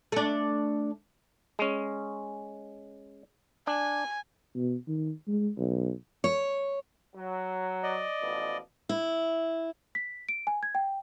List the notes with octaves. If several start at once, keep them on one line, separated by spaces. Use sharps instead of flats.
A3 D4
G#3 C#4
D4 G#5
B2
D#3
G#3
B1
C#5
F#3
D5 D#5
A1 B2 F3
E4
B6
D7
G#5
G#6
G5